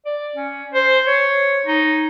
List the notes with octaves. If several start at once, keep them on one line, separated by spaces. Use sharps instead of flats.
D5
C#4
C5
C#5
D#4